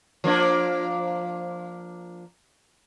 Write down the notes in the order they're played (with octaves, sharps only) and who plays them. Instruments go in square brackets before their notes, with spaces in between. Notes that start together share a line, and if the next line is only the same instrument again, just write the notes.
[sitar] F3 A#3 D4